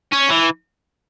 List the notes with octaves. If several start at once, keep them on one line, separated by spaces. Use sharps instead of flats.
C#4
E3